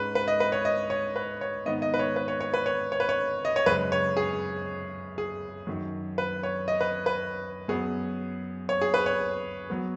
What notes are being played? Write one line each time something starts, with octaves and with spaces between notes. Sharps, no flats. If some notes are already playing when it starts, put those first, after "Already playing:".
Already playing: G#2 G#3 C#4 B4
B4
D#5
B4
C#5
D#5
C#5
B4
C#5
G#2 D#3 B3 D#5
D#5
B4
C#5
B4
C#5
C#5
B4
C#5
C#5
B4
C#5
D#5
C#5
F#2 C#3 G#3 B4
C#5
G#4
G#4
F#2 D#3 F#3
B4
C#5
D#5
B4
B4
F#2 F#3 B3 G#4
C#5
G#4
B4
C#5
F#3 B3